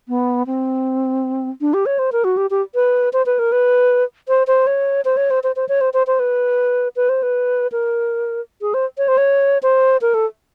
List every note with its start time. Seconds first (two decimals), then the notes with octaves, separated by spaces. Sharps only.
0.08 B3
0.47 C4
1.61 D4
1.74 G4
1.86 C#5
1.99 C5
2.12 A#4
2.24 F#4
2.37 G4
2.51 G4
2.75 B4
3.13 C5
3.26 B4
3.39 A#4
3.52 B4
4.28 C5
4.47 C5
4.67 C#5
5.05 C5
5.17 C#5
5.30 C5
5.43 C5
5.56 C5
5.69 C#5
5.81 C5
5.94 C5
6.07 C5
6.20 B4
6.96 B4
7.09 C5
7.23 B4
7.72 A#4
8.61 G#4
8.74 C5
8.98 C#5
9.08 C5
9.18 C#5
9.63 C5
10.02 A#4
10.14 A4